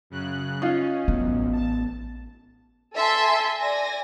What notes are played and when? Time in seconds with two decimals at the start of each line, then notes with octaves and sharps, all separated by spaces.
0.10 F#2 C#3 F#6
0.62 C#4 D#4 F4
1.08 A1 F#2 B3
1.53 A5
2.96 A4 E5 G#5 A5 C6
3.60 D5 G#5 A#6